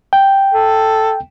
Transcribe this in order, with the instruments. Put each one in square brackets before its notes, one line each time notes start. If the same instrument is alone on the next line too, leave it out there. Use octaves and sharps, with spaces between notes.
[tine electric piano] G5
[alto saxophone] A4